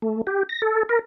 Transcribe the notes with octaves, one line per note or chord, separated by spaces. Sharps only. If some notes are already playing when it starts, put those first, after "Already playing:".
A3
G4
A#6
A4
A#4